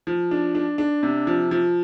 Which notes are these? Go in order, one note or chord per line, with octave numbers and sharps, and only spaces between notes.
F3
D4
D4
D4
C3
F3
F3